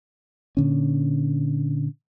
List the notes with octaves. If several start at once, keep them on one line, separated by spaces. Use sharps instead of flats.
A#2 D3 C#4